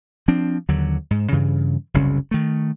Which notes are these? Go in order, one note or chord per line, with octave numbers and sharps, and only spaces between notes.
F3 C4 D4
D#2 D3 F#3
G#2
G2 C#3 E3
F#1 C2 C#3 C#4
D#3 A3